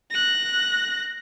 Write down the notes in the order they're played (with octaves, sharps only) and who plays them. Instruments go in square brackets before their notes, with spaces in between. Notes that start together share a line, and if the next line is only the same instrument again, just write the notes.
[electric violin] F#6 A#6